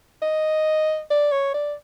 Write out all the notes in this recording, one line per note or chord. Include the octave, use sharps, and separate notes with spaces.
D#5
D5
C#5
D5